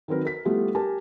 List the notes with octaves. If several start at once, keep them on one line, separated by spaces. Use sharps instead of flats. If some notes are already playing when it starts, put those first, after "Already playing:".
D#3 F#3 C4 A#4 B4
A#4 B6
G3 A3 B3 E4 F4 G4
G4 A#4 G#5 A5